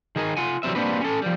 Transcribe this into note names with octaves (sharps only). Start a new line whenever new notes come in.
D#3 G#4 A#4
F4 F#5 G#5
E3 F#3 G3 C4 E5
G3 A#3 C4 D4 B4
C#4 A4
F3 G3